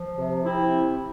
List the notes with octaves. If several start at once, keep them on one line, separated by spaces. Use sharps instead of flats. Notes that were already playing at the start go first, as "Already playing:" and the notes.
Already playing: F3
C3
C3 C4 E4